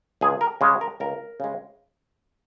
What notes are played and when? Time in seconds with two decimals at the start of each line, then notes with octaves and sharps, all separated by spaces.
0.21 C#2 G#4
0.41 A#4
0.61 C#3 G#3
0.81 A#4
1.00 C#2 A#4
1.40 C#3 G#3